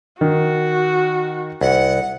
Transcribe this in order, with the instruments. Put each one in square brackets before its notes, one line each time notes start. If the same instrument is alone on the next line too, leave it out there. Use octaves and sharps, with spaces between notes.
[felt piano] D#3 [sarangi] F#4
[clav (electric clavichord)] C2 [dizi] F#5